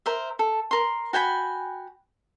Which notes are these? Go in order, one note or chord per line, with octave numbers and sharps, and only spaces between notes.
A#4 C5 E5
A4
A#4 C6
F#4 G5 G#5 B5